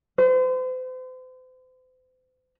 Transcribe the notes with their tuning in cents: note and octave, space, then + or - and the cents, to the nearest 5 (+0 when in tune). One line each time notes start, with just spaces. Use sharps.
C5 -40